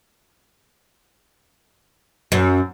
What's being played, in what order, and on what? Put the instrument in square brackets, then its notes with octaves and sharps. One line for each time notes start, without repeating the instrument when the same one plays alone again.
[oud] F#2